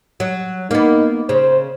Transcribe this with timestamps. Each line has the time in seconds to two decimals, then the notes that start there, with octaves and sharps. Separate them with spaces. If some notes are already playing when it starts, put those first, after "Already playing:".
0.20 F#3
0.71 A#3 B3 D#4
1.29 C#3 C5